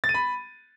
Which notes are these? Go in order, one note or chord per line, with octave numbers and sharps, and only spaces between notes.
A6
D#7
B5